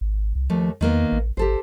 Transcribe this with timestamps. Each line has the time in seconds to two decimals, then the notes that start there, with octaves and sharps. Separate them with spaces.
0.01 G#1
0.35 C2
0.50 D#2 F3 A3
0.81 E2 D#3 A#3 B3
1.12 A1
1.37 G#1 G4 A4 C5